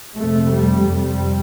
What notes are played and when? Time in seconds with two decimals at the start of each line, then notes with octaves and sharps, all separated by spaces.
0.17 F2 C3 A3
0.53 G3
0.88 F2 C3 G3